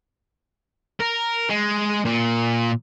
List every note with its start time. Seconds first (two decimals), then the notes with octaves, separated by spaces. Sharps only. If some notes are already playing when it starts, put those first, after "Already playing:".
1.00 A#4
1.49 G#3
2.05 A#2